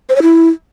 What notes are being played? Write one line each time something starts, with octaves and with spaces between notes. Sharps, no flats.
C5
C#5
E4